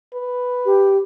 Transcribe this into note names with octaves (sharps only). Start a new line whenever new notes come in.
B4
G4